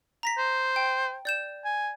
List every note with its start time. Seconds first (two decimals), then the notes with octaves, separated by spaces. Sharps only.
0.23 A#5 A#6 B6
0.38 C5
0.76 G5
1.25 D5 G6 E7
1.65 G#5